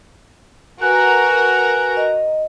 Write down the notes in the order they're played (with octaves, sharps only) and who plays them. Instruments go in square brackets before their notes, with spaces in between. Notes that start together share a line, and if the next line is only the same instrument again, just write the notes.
[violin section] F#4 A#4 A#5 [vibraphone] B4 G#5 [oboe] F#5
[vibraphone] D#5